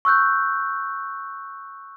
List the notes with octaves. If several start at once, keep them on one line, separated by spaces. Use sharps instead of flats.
C#6 E6 F#6 G6